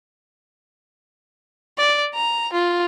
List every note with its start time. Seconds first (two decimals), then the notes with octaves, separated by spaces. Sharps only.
1.78 D5
2.15 A#5
2.53 F4